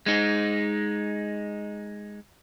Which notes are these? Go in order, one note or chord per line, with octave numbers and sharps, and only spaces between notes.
G#3 D#4